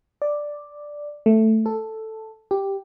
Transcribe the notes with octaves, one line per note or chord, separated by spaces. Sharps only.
D5
A3
A4
G4